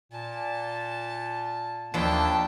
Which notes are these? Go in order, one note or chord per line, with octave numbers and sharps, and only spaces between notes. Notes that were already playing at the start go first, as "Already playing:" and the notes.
A#2 A5
D#2 F3 D4 E4 G5 A5